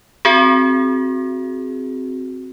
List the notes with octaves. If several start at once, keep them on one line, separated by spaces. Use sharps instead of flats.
C4 F#4 G#4